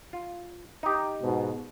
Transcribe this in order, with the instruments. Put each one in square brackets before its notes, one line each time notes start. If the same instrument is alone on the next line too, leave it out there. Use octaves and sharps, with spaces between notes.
[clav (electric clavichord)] F4
D#4 G4
[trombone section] G#2 B2